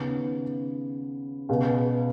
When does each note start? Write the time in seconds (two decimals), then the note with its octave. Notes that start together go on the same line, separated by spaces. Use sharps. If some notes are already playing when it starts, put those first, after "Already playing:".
Already playing: D#2 C#3 B3
1.49 C#2 B2 B3